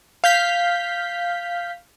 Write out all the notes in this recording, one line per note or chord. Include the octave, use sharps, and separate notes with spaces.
F5 G6 B6